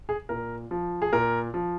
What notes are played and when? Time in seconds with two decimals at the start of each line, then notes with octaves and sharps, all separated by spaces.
0.09 G#4
0.29 A#2 A#4
0.71 F3
1.02 G#4
1.13 A#2 A#4
1.54 F3